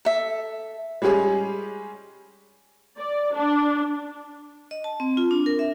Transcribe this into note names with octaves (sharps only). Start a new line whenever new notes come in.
A4 E5
G3 G#3 C#4 G4 G#4
D5
D4
D#5
A5
C4
F4
D4
A#4
E5